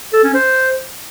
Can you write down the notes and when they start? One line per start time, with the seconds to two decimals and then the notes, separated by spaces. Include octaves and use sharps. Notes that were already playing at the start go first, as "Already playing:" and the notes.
0.13 A4
0.24 C#4
0.34 C5